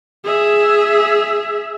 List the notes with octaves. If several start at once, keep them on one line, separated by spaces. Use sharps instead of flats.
G#4 E5